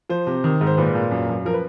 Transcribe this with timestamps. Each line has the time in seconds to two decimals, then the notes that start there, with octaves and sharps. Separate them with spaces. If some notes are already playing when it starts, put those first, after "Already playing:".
0.10 F3 C5
0.27 C3
0.44 D#3
0.61 G#2
0.67 C5
0.78 A#2 B4
0.95 A#2
1.11 F#2
1.29 F#2
1.45 F3 A#4
1.54 B4